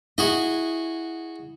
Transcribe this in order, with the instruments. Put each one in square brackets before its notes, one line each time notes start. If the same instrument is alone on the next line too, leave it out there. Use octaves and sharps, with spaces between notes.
[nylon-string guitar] E4 [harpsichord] F#4 G#4 D#5